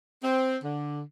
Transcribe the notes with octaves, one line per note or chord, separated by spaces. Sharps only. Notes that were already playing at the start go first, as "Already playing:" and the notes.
C4
D3